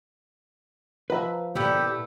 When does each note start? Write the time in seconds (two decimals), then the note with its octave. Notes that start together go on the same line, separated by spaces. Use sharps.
1.10 F3 B4 D#5 E5 F#5 A#5
1.55 C#2 A#2 A3 B3 E4 G4